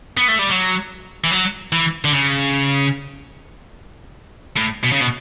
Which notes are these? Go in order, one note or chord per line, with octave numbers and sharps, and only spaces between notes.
B3
A3
G3
F#3
E3
F#3
E3
D3
C#3
A2
B2
C#3
B2